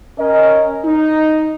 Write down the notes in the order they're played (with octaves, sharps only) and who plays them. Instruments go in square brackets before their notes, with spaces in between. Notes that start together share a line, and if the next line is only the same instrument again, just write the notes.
[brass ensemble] C#4 A#4 D#5
D#4